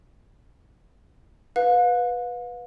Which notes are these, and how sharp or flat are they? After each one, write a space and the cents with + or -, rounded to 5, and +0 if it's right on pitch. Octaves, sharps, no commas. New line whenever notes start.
B4 +0 F5 +40